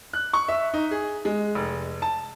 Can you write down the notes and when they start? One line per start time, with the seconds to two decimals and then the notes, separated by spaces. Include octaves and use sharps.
0.13 F#6
0.33 C#6
0.48 E5
0.74 D#4
0.91 G#4
1.25 G#3
1.55 F1
2.02 A5